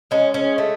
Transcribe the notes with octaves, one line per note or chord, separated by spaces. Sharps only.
G#3 C#4
C#4
A3